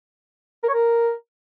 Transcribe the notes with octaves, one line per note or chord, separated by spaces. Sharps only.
A#4
C#5
A#4